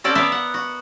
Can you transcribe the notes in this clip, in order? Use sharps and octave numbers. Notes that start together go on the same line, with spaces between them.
C4 C#4 A4 D5
B3 A#4 D5 E5 F5
F#5
F#4